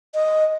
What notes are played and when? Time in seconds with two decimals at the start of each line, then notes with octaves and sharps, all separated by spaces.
0.14 D#5